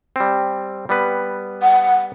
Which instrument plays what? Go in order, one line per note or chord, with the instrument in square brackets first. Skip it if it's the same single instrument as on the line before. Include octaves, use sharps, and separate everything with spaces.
[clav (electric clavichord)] G3 C4
G3 B3 B4
[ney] F#5